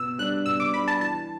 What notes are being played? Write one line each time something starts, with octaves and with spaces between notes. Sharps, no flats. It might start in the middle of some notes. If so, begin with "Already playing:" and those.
Already playing: B2 E6
G3 D4 F#6
B2 E6
D6
G3 D4 B5
A5
E3 A5